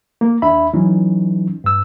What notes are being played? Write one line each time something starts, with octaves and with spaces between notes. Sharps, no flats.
A#3
D#2 D4 E5 B5
E3 F#3 C#4 D#4
G2 E6